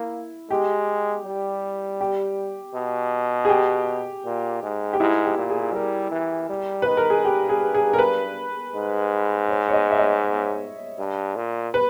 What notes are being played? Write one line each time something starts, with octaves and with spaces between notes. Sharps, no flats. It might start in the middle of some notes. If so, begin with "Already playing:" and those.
Already playing: A#3 E4
G#3 G4
G3
G4
B2
G#4
G4
A#2
G#2
G4
G#2 E4
G4
A#2
G#4
G3 A#4
E3
G3
D#3 B4
A#4
G#4
G2 G4
G#4
G#4
A#4
B4
G#2
C#5
C#5
D#5
E5
D#5
G2
A#2
B4